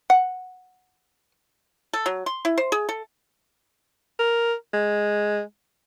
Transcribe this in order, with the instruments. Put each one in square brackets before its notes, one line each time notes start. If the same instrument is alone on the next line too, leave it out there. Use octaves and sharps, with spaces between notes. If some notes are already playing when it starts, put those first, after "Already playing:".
[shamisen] F#5
[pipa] A4
F#3
C6
E4
C5
G#4
A4
[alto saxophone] A#4
G#3